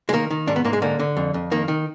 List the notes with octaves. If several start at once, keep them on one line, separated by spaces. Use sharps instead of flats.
G#3
D#3 A#3
D#3
G#2 D4
B3
G#2 A#3
G#3
D3 A#3
D3
F2
F2
D#3 A#3
D#3